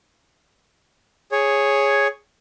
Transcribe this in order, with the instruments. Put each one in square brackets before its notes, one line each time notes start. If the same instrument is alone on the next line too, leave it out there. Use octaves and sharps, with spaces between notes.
[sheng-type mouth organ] G#4 C#5